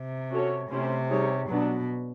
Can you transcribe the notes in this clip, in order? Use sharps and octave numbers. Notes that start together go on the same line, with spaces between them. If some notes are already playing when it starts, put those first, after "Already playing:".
Already playing: C3
C#4 F#4 A4 C#5
C3 A3 C#4 E4 G4 C5
G3 C4 D#4 G#4 C#5
B2 F#3 B3 D4